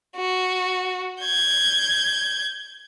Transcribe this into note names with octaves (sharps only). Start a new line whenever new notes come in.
F#4
G6 G#6